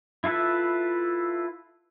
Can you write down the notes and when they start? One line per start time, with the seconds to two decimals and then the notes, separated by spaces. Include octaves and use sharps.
0.24 E4 F4 A4 B4 E5